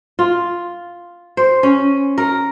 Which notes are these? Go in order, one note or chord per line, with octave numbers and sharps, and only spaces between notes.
F4
C5
C#4
A#4